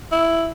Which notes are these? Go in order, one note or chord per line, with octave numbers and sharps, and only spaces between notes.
E4